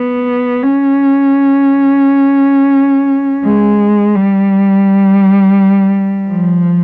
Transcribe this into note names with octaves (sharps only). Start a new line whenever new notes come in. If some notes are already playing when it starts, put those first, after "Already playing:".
Already playing: B3
C#4
G#3
G3
F3